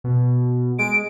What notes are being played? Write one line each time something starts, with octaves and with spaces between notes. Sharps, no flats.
B2
G#3 D7